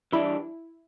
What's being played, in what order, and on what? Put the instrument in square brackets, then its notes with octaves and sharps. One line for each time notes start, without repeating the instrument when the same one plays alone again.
[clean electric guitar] E3 G3 D4 [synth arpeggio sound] E4